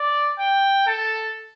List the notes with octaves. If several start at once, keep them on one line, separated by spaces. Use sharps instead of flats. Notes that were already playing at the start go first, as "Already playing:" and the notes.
Already playing: D5
G5
A4